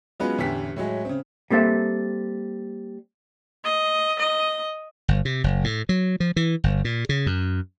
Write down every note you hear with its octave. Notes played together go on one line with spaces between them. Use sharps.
F#3 G#3 B3 C#4 F4 B4
A1 E2 D3 G4 B6
A2 F#3 G#3
C#3 C4
G3 A#3 C4 A4 E5
D#5
D#5
G1
C3
F#1
A2
F#3
F3
E3
G1
A#2
C#3
F#2